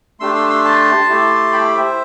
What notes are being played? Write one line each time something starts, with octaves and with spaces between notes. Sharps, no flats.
A3 D4 G4 C6 E6
C6 E6
C6 E6
A5 C6
A3 E4 G4
G5 B5
C5 E5